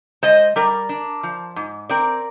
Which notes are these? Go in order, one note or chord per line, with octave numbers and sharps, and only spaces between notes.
G#3 C5 D#5
G3 A#4 D5
D4
F3
G#2
C4 A#4 D5